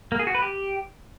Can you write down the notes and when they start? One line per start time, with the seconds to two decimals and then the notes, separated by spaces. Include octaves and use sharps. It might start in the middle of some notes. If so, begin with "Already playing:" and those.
0.12 A#3
0.19 G#4
0.27 F#4
0.35 B4
0.42 G4